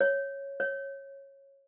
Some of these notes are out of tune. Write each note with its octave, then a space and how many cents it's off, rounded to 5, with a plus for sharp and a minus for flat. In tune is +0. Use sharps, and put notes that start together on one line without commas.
C#5 -5
C#5 -15